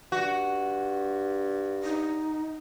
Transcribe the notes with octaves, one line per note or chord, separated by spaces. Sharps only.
G2 F#4
D#4